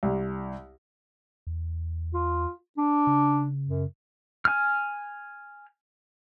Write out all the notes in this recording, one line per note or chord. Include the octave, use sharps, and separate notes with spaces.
C2
E2
F4
D4
C#3
F#2
G#5 F6